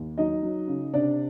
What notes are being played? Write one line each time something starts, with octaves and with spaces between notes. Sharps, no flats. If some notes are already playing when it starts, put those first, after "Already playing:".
Already playing: D#2
F#3 D#4 D#5
F#3
C#3
C3 D4 D5